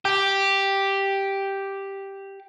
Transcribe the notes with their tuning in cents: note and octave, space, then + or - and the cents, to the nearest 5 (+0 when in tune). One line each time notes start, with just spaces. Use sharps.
G4 +0